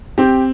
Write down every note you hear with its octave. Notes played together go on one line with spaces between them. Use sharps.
C4 G4